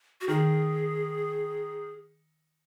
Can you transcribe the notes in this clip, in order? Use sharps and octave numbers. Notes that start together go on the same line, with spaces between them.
F#4
D#3 G#4